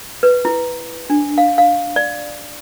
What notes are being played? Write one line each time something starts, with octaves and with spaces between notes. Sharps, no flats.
B4
E4
D4
F5
F5
D5